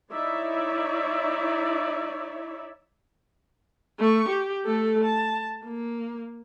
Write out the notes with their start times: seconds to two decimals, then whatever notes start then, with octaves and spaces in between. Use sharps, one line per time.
0.11 D#4 E4 C#5 D5 E5
3.99 A3 C#6
4.29 G4
4.65 A3 A4
5.04 A5
5.65 A#3